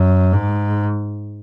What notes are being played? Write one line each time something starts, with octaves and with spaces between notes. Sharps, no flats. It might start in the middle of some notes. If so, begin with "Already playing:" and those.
Already playing: F#2
G#2